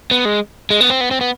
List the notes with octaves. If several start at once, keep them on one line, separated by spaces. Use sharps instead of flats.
B3
G#3
G#3
B3
C4
B3
C4
B3